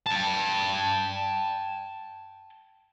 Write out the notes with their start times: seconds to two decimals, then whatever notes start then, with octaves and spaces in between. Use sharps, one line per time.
0.07 G5 A5